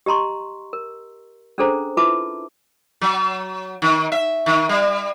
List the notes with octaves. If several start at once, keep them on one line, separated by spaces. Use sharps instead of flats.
G4 D#5 A#5 C6 C#6
A#4
C#4 D4 G#4 A4 C5 A#5
E4 F4 B4 E5 A5 D6
F#3
D#3
E5
D#3
G3